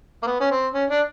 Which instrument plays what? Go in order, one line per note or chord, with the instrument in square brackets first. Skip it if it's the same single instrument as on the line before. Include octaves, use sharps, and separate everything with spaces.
[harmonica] A#3
B3
C#4
C4
C#4
D4